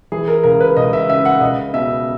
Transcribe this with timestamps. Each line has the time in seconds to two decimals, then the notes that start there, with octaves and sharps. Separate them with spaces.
0.12 E3 G#4
0.28 A#4
0.44 C#2 A#4
0.61 B4
0.77 C#2 D#5
0.93 E5
1.09 C#3 E5
1.25 F#5
1.41 C#2 D#5
1.73 B2 E5